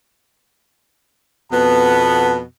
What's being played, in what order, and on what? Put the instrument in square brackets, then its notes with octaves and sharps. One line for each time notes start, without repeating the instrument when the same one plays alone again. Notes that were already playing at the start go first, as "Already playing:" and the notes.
[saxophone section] F2 B2 B3 [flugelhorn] A5